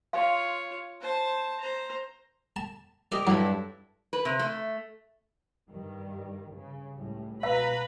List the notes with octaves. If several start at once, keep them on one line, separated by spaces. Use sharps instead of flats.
F4 C#5 F5 C6
C5 A5
C5 A#5
A5
G4 A#4 D5 D#5
G2 F#3 E4 A4
B4
C3
A3
G2 D#3 G3
C#3
C#2 A2 G3
B2 B4 F5 A#5 B5